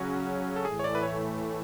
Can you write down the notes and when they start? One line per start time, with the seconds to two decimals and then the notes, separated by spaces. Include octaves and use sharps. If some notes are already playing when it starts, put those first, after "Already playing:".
Already playing: C#3 F#3 C#4 F#4
0.56 A4
0.65 A2 E3 A3 G#4
0.79 C#5
0.84 D5
0.95 B4
1.03 C#5